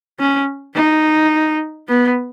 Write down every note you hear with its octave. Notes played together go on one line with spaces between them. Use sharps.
C#4
D#4
B3